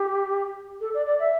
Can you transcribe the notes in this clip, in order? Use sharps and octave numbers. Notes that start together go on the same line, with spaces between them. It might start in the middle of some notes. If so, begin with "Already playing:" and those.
Already playing: G4
A4
D5
D5
E5